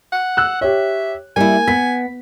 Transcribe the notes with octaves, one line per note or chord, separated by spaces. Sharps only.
F#5
E6 F#6
G4 C#5 E5
G3 A#3 E4 G#5
B3 B6